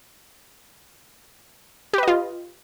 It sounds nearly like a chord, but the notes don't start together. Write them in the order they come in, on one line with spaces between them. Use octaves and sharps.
G4 B4 D#5 F4